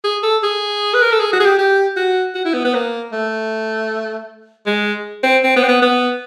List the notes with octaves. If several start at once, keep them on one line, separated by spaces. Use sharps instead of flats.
G#4
A4
G#4
B4
A#4
A4
G#4
F#4
G#4
G4
G4
F#4
F#4
E4
B3
B3
A#3
A3
G#3
C4
C4
B3
C4
B3
B3